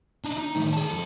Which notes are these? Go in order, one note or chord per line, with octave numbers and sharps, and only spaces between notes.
D4 D#4
D#4
A2 D#3
G#4 A5
F2 A4